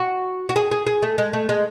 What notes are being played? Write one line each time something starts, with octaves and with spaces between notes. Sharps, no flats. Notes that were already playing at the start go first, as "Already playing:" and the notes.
Already playing: F#4
F#4
G#4
G#4
G#4
A3
G#3
A3
G#3